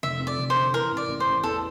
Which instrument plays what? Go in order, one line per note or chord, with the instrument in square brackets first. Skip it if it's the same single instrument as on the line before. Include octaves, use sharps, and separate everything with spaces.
[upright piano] F1 [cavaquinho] E5
[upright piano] F2
[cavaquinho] D5
[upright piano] F1
[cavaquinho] C5
[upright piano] D3
[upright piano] E3 [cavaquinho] A#4
[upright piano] A1
[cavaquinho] D5
[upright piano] A1
[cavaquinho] C5
[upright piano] A1
[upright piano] E2 [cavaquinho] A4